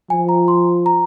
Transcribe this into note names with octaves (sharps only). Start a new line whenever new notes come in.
F3 G#5
A#5
C6
A#5